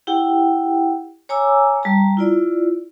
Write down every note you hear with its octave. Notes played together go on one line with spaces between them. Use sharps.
E4 G4 F#5 G5
C#5 G#5 A#5 D6 E6
G3 A5 A#5
E4 F4 D5